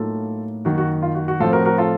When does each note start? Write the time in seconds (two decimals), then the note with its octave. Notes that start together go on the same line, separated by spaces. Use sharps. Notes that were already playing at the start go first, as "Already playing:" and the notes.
Already playing: A2 F#3 A#3 D#4 F4 A4
0.65 F#2 D#3 A#3 F#4
0.78 F#4
1.02 F4
1.15 F#4
1.28 F#4
1.40 A2 F3 C4 F4 A4
1.53 F#4 A#4
1.65 F#4 A#4
1.78 F4 A4